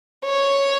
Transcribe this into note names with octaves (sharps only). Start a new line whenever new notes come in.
C#5